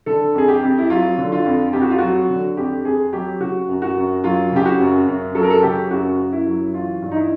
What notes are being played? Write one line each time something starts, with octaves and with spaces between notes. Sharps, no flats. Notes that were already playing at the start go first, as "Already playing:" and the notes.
D3 A4
F2 G#4
G4
F2
E4
F#3 F4
D3
F4
F2
F2 G4
F#4
F4
F#3 F#4
D3
F2 G4
F2 G#4
F#3 G4
C#3 F#4
F#2
F#4
F#2
F#3 F4
C#3 G4
F#4
F#2
F#2
F#3 A4
A#4
A4
C#3 G4
F#2 F#4
F#2
E4
F#3
E3 F4
G2
D#4
E4